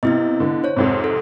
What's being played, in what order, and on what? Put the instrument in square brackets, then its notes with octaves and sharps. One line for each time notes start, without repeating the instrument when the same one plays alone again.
[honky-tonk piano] C3 [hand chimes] B3 E4 D#5
[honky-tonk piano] D3
[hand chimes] C5 C#5
[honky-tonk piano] F2 G#2 C3
[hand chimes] A4